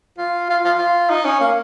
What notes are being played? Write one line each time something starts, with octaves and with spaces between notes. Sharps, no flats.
F4
F4
F4
F4
D#4
C#4
A#3